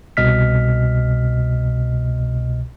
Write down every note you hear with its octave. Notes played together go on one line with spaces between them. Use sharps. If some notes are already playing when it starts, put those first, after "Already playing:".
C2 B2 D#5 F6 B6